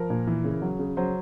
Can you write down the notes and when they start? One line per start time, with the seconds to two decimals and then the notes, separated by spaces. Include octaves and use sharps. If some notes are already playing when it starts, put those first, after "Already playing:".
Already playing: F3 A#4
0.10 A#2
0.27 E3
0.44 C#3
0.62 F#3
0.79 C#3
0.97 F#3 C5